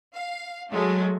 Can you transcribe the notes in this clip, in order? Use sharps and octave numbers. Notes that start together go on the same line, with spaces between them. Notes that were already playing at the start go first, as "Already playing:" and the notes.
F5
F#3 G#3 A3